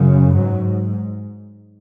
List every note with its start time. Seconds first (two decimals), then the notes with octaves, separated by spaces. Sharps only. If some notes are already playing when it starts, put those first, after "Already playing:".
Already playing: F#2 C#3
0.34 G#2 F#3